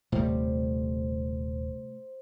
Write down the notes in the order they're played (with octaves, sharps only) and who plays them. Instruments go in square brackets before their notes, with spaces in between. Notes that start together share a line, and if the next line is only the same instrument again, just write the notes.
[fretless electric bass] D#1 [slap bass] A2 C3 G3 [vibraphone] C5